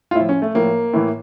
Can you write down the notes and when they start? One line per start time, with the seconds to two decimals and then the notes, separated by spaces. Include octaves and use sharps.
0.11 F4
0.15 A2 E4
0.20 F3
0.29 C#4
0.42 A3
0.54 A2 F3 A#3
0.93 A2 E3